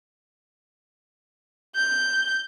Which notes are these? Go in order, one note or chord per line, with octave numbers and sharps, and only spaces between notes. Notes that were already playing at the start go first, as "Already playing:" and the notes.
G6